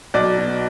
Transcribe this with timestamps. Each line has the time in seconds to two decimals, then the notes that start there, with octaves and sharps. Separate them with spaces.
0.14 B1 D5
0.38 B2